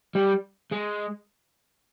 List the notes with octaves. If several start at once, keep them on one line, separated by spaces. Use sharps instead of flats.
G3
G#3